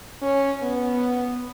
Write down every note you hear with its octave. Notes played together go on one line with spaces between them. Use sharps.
C#4
B3